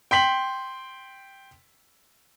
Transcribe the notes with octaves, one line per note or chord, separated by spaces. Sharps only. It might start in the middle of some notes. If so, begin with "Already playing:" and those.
G5 C6 B6 F#7